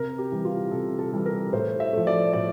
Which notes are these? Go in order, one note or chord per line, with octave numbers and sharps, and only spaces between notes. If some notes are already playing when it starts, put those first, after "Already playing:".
Already playing: C3 A#4
G4
E3 G3
F4
C3 A4
A4
E3 G3
A#4
A2 C5
E5
F3 A3
D5
A2 D5